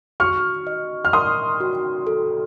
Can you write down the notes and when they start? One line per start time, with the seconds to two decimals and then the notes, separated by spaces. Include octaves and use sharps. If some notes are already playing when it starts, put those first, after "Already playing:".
0.20 F#4 C#6 F6
0.67 D#5
1.05 F6
1.13 A#4 C6 D#6
1.60 F#4
2.07 A4